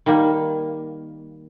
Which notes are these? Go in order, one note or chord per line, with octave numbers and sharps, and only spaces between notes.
D#3 G3 A#3